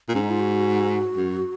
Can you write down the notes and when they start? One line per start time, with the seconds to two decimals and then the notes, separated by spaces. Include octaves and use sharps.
0.08 A#2
0.13 G#2 C#4
0.22 D#4
0.30 F4
0.40 F#4
1.17 F#2